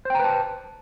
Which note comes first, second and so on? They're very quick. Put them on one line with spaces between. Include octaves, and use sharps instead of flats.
C5 G5 A#5 B4 A5